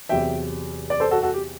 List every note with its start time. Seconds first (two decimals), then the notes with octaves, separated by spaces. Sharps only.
0.09 E2 C3 F#3 E5 G5
0.90 D5
1.00 A4 C5
1.11 F#4 A4
1.22 F#4 A4
1.34 G4